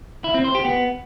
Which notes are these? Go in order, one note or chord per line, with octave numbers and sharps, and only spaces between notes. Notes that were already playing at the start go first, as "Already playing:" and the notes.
E4
C4
C5
G4
B3